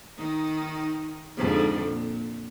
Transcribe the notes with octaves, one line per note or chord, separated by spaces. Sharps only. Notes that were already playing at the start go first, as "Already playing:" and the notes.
D#3 D#4
F2 G#2 D3
A#2